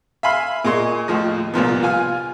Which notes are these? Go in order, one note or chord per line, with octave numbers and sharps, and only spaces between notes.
E5 F5 G#5 B5 C6 F6
A#2 G#4 D#5 C6 C#6
D#2 A2 F3 D#5
C2 A#2 F3 B3
F4 G#5 F6